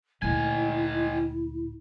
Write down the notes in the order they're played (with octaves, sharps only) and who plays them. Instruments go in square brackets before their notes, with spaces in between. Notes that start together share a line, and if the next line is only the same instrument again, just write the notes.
[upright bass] D2 A#2 [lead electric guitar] D#3 G#5 [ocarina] E4